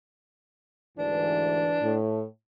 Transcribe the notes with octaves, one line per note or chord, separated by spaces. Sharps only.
D2 G#2 E3 D4
A2